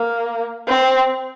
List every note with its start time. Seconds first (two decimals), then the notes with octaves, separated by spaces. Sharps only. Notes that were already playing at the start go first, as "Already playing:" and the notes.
Already playing: A#3
0.67 C4